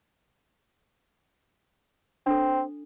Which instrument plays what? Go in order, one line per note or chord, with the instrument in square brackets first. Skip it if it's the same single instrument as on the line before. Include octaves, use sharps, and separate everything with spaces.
[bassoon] C4 [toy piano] D4 A4